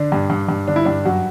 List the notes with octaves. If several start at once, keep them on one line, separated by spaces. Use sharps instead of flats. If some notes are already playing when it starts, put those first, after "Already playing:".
Already playing: D3 D4
G2
G2
G2
D3 D4
E4
G2 D4
F#2 F#4